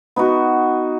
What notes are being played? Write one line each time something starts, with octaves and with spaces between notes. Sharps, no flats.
B3 D#4 F#4